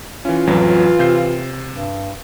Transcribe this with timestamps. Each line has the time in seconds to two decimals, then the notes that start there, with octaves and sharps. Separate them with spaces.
0.25 E3 C#4 F4
0.47 A1 F2 E3 F#3
0.99 C3 G6 C7
1.72 G2